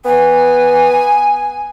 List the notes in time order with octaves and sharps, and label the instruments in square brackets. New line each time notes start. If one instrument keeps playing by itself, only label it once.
[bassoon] B3 [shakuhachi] G#5